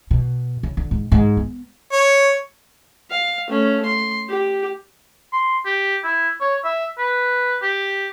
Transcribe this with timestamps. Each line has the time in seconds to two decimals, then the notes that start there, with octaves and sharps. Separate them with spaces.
0.11 B2
0.63 C#3
0.77 D3
0.91 G#2
1.12 G#2
1.37 B3
1.92 C#5
3.10 F5
3.49 A3 C#4
3.85 C6
4.29 G4
5.33 C6
5.66 G4
6.04 E4
6.41 C#5
6.64 E5
6.98 B4
7.62 G4